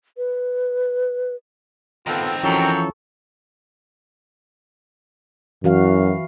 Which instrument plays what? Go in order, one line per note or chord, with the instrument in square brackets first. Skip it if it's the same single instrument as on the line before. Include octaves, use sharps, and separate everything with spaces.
[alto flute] B4
[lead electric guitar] D#3 C4 [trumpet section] B3 F4 A4
[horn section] F#2 G5 [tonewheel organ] E3 F3 C#4 [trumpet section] A4 A#5 C#6
[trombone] F#2 [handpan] E3 F#4 F5